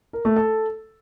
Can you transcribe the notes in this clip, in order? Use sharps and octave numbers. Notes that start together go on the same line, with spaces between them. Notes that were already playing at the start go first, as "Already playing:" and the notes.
A#4
A3
A4